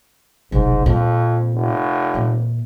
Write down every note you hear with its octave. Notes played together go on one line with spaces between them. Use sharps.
F1 B1 G#2
F2 A#2
F1
A#2 E3